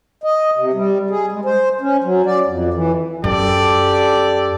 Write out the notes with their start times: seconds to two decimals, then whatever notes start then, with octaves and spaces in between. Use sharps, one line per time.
0.24 D#5
0.58 C3
0.74 G3
1.10 G#4
1.32 G#3
1.45 C5
1.81 C#4
2.04 F#3
2.26 D5
2.46 F2
2.74 E3
3.24 F#2 G4 A4 D5